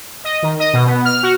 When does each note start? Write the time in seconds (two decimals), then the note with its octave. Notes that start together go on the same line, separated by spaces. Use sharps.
0.24 D#5
0.42 D#3
0.60 D#5
0.73 B2
0.86 B3
1.05 F6
1.23 F#4